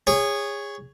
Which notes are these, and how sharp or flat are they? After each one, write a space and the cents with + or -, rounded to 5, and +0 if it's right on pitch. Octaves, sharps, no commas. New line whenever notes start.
G#4 -25 C#5 +0